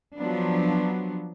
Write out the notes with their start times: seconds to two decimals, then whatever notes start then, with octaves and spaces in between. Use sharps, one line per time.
0.17 F3 F#3 B3 D4